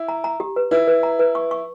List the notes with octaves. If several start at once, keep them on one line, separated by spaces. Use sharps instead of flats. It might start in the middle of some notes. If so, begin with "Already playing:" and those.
Already playing: E4
A#5
A#5
G4
B4
E4 B4
B4
A#5
B4
C#6
C#6